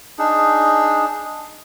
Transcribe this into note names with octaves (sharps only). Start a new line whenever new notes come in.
D4 D#4 G#4